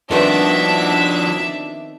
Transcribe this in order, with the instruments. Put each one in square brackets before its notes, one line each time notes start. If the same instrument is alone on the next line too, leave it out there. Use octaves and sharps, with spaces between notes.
[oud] D#3 B3 C4 [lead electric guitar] F3 F#4 [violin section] D4 E5